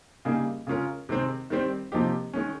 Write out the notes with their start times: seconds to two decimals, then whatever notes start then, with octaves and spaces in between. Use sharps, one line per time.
0.25 C#3 G3 A#3 D#4 G#4
0.67 C#3 G#3 C#4 F4 A#4
1.09 C3 D#3 G#3 C4
1.50 D#3 G3 C4
1.92 C3 F3 A#3 D#4 G4
2.33 D#3 G#3 C#4